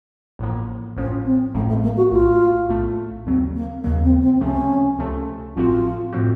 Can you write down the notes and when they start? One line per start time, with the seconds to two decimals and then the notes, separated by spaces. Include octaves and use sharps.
0.39 A1 A2 F3 A#3
0.97 A1 A2 F3 C#4
1.25 C4
1.54 A1 A2 F3 A3
1.69 A3
1.83 A#3
1.97 F#4
2.11 A#1 A2 A3 F4
2.69 A#1 A2 A3
3.26 D#2 C#3 F#3 C4
3.55 A#3
3.83 D#2 C#3 F#3 A#3
4.03 C4
4.21 C4
4.41 C#2 C3 F3 A3 C#4
4.98 C#2 C3 F3 A3
5.56 A1 A2 F3 C4 F4 F#4
6.13 A2 F3 C4 F#4